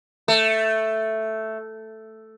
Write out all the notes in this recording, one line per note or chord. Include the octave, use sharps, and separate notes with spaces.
A3